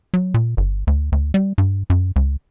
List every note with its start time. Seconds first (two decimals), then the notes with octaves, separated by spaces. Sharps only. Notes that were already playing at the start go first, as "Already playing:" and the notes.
0.14 F#3
0.34 A#2
0.57 G1
0.87 D2
1.12 D2
1.34 G3
1.58 G2
1.90 F#2
2.16 C#2